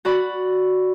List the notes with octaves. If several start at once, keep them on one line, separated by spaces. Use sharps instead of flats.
F#4 D5 B5